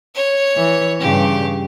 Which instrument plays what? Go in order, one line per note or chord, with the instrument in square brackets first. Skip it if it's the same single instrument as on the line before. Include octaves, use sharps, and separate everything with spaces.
[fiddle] C#5
[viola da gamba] E3
[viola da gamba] G2 C#3 [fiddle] G4